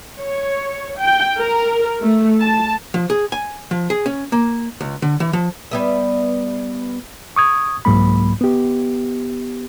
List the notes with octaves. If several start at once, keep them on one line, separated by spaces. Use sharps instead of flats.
C#5
G5
A#4
A3
A5
F3
G#4
G#5
F3
G#4
C#4
A#3
C#2
D3
E3
F3
G3 B3 E5
C#6 D#6 G#6
C2 G#2 F#3 A#3 B5
B3 G4